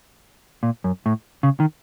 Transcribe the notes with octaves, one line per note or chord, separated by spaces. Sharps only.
A#2
F#2
A2
C#3
D#3